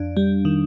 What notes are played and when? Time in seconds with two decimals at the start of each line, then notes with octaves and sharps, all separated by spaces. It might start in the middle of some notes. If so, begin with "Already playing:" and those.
Already playing: F2 D4
0.17 G3
0.45 D#3